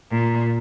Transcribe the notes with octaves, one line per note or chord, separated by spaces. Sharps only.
A#2